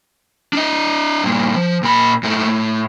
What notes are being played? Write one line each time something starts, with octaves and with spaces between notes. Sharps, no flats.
D4 D#5
G2 A#2
F3
A#2 B5
G#2 A3
A2